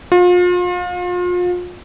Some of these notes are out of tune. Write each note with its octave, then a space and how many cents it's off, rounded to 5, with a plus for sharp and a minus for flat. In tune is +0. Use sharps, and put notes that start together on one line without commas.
F4 +35